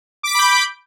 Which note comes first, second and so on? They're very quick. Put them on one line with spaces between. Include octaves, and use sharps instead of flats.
D6 B6 D7 B5 G6